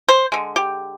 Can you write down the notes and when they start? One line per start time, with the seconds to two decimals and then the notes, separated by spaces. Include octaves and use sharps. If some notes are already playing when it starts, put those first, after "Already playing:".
0.08 C5
0.32 D3 G#3
0.56 G4